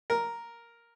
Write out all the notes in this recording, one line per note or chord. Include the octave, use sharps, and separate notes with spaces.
A#4